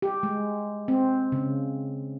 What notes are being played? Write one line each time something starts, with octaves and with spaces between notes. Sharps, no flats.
G4
G#3
C4
C#3